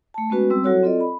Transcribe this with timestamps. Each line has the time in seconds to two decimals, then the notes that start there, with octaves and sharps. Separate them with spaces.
0.14 A3 A5
0.30 G#3 B3 C#4 F#4 B4
0.50 G3 C4 E6
0.64 F#3 E4 F#4 A4 C#5
0.83 C4 F4 A4 D5 D#5
1.00 B5